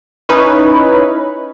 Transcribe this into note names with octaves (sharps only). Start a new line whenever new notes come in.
C#4 D#4 E4 B4 C#5